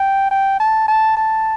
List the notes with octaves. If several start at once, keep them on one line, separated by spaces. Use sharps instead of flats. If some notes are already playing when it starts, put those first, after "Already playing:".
Already playing: G5
G5
A5
A5
A5